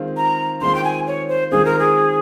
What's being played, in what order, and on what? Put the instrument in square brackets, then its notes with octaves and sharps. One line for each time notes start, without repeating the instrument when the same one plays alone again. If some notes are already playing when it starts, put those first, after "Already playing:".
Already playing: [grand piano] D#3 G#3 C4 F4
[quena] A#5
[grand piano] D#3 G#3 C4 F4 [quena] C6
[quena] G5
G#5
C#5
C5
[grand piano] D#3 G#3 C4 F4 [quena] G#4
[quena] A#4
G#4